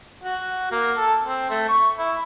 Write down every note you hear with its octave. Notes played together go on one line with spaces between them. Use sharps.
F#4
A#3
A4
C4
A3
C#6
E4